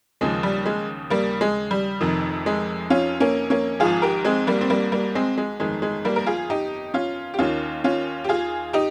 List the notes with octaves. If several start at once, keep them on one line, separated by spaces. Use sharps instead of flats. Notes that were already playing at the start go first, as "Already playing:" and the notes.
D#2 C#3 F3 G#3
G3
G#3
G3 A#3
G#3
G3
F1 F2 C3 D#3
G#3
C#4 F4
A#3 C#4
A#3 C#4
G#1 G#2 F3 F4 G#4
G4 A#4
G#3 C4
G3 A#3
C4
G3 A#3
G3 A#3
G#3 C4
G#3
G1 F2 D#3 G#3
G#3
G3 A#3
A#4
F4 G#4
D#4 G4
C#4 F4
G4
D#2 D#3 C#4 F4
C#4 F4
G4
F4 G#4
D#4 G4